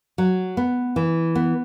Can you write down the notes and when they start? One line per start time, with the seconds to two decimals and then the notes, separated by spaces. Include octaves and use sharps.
0.18 F#3
0.57 B3
0.96 E3
1.35 B3